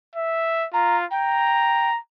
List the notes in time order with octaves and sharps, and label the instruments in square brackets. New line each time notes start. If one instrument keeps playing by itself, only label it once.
[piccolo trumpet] E5
[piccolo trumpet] F4 [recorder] A#5
[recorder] G5 [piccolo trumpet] A#5